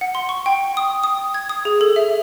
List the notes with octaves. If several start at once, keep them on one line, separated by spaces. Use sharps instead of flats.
F#5
C6
C#6
G5
D#6
D#6
G#6
D#6
G#4
A4
E5